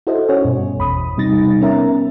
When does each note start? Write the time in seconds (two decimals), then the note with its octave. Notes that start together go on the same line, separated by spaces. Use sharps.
0.07 E4 F#4 A4 C5 D#5
0.29 C#4 F#4 C#5 G#5
0.45 G2 B2
0.77 G#1 E2 B5 D#6
1.17 C3 G3 D#4 A6 A#6
1.61 B3 C#4 A#4 E5 A#5